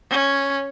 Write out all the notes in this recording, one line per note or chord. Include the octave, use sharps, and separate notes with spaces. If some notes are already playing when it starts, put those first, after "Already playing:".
C#4